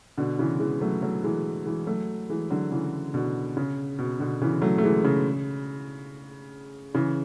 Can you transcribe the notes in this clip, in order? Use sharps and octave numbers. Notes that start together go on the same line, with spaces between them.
B2 D3
C#3 E3
E3 G#3
F#3 A3
F#3 A3
E3 G#3
E3 G#3
F#3 A3
E3 G#3
D3 F#3
C#3 E3
B2 D3
C#3
B2
B2 D3
C#3 E3
F#3 A3
A3
E3 G#3
C#3
C#3 E3